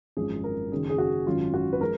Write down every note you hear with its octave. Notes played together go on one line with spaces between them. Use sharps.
G#1 F#2 F3 G#3 G#4
A#4
F#1 F#2 D#3 G#4
G#4
F#4
G#1 F#2 D#3 F#3 F4
F#4
B4
F3 G#3 A#4